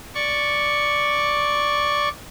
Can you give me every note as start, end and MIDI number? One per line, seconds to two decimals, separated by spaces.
0.15 2.09 74
0.15 2.09 85